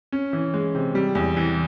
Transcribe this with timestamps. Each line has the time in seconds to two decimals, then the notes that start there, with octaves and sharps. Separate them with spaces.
0.12 C#4
0.33 E3
0.54 G#3
0.75 C3
0.95 G3
1.15 E2
1.37 E3